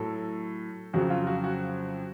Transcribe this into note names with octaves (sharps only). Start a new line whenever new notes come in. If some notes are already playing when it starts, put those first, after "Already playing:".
Already playing: A2 F#3 A4
F2 C#3 F#3 F#4
F4
F#4
F#4